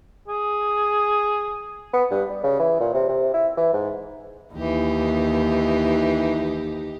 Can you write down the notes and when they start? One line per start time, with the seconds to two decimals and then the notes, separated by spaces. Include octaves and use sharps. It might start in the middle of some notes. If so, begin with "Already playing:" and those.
0.28 G#4
1.93 B3
2.11 G2
2.30 G3
2.43 C#3
2.59 E3
2.80 A#2
2.94 C3
3.09 C3
3.34 E4
3.57 E3
3.73 G#2
4.54 D#2 E3 D#4 G4